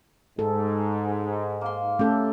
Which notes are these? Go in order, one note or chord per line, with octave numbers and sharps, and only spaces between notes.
G#2 A4
A#3 C6
A3 C#4 G4 A4